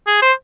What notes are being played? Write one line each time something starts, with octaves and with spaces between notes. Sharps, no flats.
G#4
C5